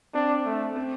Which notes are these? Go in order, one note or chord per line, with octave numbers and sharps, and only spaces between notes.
C4 D4
A3
C4